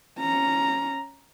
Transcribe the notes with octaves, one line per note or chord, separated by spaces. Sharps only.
C#4 A#5